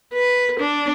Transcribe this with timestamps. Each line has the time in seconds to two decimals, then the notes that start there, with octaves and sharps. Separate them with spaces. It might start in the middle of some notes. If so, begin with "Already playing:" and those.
0.13 B4
0.60 D4